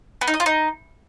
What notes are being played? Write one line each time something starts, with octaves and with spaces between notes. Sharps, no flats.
B3
D#4
D#5
F4
D#4